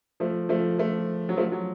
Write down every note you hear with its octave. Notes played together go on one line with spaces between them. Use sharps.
F3 A3
F3 A3
F3 A3
F#3
F3 A3
F#3